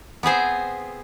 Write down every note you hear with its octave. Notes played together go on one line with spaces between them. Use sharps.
B3 C4 G#4 C5